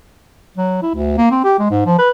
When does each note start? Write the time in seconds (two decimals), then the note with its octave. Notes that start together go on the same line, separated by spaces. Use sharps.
0.57 F#3
0.82 E4
0.94 D2
1.18 A#3
1.31 C4
1.44 G4
1.59 G#3
1.71 G#2
1.86 F3
1.99 B4